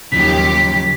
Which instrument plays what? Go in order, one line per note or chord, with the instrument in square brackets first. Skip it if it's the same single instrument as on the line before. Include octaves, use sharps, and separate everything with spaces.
[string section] D#2 G4 [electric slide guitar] C#3 F3 F#3 [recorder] B6